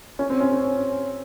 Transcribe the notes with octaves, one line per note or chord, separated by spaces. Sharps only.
C#4
C4
C#4
C#4